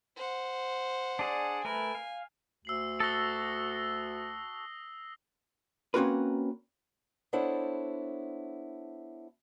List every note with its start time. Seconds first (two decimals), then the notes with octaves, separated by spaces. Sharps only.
0.17 C5 F#5
1.19 D4 G#4 D5
1.64 A3 A#4 B4 G#5
1.95 F5
2.65 D2 E6 C7 F#7
3.00 F#4 A4 D#6 A#6 G7
5.94 A#3 C4 C#4 F#4 A#4 B4
7.33 B3 D4 E4 A4 C5 C#5